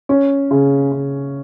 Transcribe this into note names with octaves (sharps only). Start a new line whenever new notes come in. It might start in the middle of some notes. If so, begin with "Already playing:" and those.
C#4
C#3
C#3